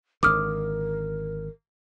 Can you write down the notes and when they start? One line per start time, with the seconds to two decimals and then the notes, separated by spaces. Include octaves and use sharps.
0.23 G#1 D3 A#4 D6 D#6 F6